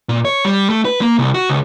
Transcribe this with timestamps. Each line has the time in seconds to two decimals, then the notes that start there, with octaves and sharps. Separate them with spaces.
0.09 A#2
0.25 C#5
0.45 G3
0.70 A3
0.85 B4
1.01 A#3
1.19 C2
1.34 F#4
1.49 C#2